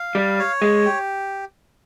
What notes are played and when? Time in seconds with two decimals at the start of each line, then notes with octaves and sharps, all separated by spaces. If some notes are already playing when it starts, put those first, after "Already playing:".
Already playing: F5
0.15 G3
0.39 C#5
0.62 G#3
0.85 G4